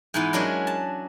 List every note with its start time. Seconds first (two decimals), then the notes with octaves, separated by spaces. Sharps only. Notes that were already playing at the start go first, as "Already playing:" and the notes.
0.14 G#2 E3 B3
0.33 F#3 G#3 C#4 D4 A#4
0.67 A5